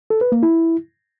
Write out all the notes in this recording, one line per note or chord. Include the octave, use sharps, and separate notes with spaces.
A4
B4
A#3
E4